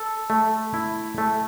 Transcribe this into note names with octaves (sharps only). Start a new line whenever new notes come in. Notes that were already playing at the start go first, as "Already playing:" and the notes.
Already playing: A4
A3
E4
A3